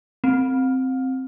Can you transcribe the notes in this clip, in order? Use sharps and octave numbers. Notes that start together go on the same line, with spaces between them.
C4